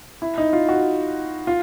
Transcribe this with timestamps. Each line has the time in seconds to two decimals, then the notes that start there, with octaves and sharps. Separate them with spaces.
0.22 E4
0.38 D#4
0.53 F4
0.69 F#4
1.47 F4